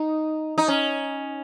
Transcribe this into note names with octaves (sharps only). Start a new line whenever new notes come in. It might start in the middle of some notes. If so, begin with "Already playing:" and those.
Already playing: D#4
D#4
C#4